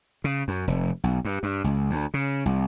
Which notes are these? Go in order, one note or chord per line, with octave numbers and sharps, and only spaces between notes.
C#3
F#2
F1
B1
G2
G2
C#2
D2
C#3
C2